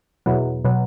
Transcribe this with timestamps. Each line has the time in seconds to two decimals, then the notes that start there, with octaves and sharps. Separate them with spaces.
0.26 E2 B2 F#3
0.65 B2 F#3